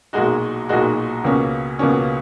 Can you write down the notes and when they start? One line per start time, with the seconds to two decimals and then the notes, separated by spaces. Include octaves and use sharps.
0.13 B1 A#2 G#3 D#4 F#4
0.69 B1 A#2 G#3 D#4 F#4
1.24 C#2 B2 A#3 C#4
1.79 C#2 B2 A#3 C#4